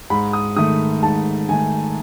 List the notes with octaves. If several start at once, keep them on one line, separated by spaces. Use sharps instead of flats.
G#2 B5
D#6
D#3 A3 D#6
G#2 A5
D#3 A3 G#5